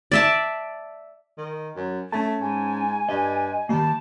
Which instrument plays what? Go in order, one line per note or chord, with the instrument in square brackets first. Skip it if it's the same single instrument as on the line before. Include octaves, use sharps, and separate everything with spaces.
[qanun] D5 E5 A5
[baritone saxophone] D#3
F#2
[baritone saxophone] A3 [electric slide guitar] C#4 A5
[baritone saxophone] G#2 [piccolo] G#5
[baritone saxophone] G2 [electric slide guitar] D#5
[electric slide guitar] D#3 A#3 [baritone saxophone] G3 [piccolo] A5